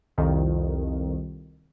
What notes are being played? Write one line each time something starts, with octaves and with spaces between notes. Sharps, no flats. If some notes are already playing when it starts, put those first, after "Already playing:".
C2 F2 D#3